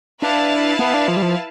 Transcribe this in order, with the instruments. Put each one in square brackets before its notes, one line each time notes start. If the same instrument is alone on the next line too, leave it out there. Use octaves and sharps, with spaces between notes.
[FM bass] D4 [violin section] E4 B4 F5 A5
[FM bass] B3
D4
F3
G3
F3